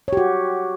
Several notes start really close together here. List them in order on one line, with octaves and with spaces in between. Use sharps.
C#5 G4 F#4